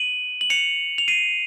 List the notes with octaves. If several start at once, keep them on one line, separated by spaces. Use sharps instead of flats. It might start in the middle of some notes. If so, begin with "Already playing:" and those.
Already playing: D#7 F#7
F#7
C#7 F7
F7
C7 D#7